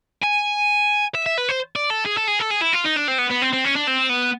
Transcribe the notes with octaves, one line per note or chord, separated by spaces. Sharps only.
G#5
E5
E5
B4
C5
D5
A4
G#4
A4
G#4
A4
G#4
E4
F4
D#4
D4
C4
B3
B3
C4
C4
C#4
D4
C4
B3